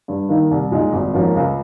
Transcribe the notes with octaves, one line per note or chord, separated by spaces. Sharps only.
G2
D#3 A#3 D#4
C2
A#2 G#3 D#4
G#1
G#2 F3 A#3 C#4
C#2